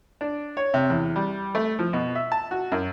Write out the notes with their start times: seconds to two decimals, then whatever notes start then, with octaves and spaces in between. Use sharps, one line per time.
0.21 D4
0.57 C#5
0.74 C3
0.90 E2
1.16 G3
1.55 A3
1.79 F3
1.93 B2
2.15 E5
2.32 A5
2.51 F#4
2.72 F#2